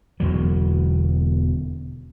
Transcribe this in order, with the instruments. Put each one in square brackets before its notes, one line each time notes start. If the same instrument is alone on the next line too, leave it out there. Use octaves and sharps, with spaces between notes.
[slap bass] E1 E2 D3 F#3